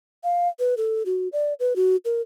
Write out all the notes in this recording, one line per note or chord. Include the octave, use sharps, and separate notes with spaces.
F5
B4
A4
F#4
D5
B4
F#4
A#4